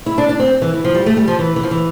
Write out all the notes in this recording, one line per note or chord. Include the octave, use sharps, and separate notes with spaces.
E4
D4
D4
C4
E3
E3
F3
G3
A3
G3
F3
E3
E3
F3
E3